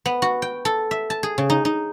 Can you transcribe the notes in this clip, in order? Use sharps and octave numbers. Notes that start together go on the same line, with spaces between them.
B3
F#4
G5
A4
E5
A5
G#4
C#3
D#4
D#4